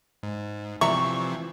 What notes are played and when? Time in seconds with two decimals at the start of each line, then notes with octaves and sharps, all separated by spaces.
0.23 G#2
0.81 C3 E3 F3 D5 E5 A#5 C#6